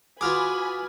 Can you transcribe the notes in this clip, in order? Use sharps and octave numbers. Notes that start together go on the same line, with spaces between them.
F4 F#4 G#4 B4 G#5 B5 D6 F6